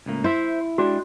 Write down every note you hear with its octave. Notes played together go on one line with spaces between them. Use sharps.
C#2 A2 A#3
E4 C5 E5
G#3 D4 F#4 G4